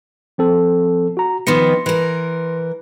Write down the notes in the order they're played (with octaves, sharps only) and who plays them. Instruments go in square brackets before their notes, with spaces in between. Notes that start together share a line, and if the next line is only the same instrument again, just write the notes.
[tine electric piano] F3 C4 A4
F#4 A#5
[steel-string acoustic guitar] D#3 F3 B3 [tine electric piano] C6 A#6 C#7
[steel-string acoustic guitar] E3 A#4